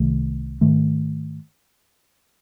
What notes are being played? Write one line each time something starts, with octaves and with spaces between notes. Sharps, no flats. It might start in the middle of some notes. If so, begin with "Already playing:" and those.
Already playing: C2 C3 D#3 A3
G#2 D#3 A3